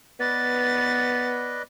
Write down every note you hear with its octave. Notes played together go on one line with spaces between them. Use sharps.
B3 B4 D5 D#5 A6